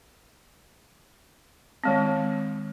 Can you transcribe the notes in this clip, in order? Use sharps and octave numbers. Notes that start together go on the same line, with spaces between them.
D#3 G#3 C4